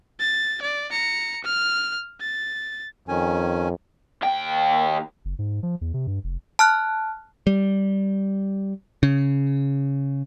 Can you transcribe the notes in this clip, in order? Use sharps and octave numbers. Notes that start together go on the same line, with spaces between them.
A6
D5
A#5 C#7
F6
A6
F2 D#3 C#4 G#5
D#2 G5
F#1
G#2
F3
E2
C3
G2
F1
A5 F6 F#6
G3
C#3